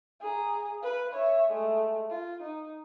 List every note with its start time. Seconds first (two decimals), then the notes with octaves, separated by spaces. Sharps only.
0.20 G#4 A#5
0.81 B4 F5
1.13 C#5 E5
1.50 G#3 A3
2.10 F4
2.42 D#4